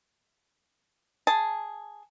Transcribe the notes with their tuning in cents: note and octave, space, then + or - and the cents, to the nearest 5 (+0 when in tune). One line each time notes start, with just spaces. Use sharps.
G#4 +0 A5 +0